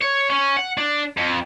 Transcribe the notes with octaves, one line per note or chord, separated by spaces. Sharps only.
C#5
C#4
F#5
D4
F2